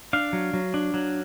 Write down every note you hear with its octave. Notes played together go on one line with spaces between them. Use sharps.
D4 F5
F#3
F#3
D4
F#3